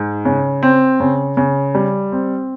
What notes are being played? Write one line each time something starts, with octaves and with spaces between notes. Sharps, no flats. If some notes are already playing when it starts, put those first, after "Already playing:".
Already playing: G#2
C#3
C4
C#3
C#3
G3
C4